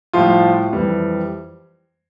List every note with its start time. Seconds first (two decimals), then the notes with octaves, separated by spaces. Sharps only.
0.13 A2 F3 G3 F4
0.73 F2 E3 G3